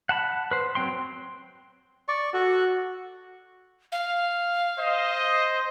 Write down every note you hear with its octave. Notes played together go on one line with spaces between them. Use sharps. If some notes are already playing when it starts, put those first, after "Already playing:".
F#5 A5 B5
B4 C5
F#3 C4 G5 C6
D5 C#6
F#4 A4
F5
C5 D#5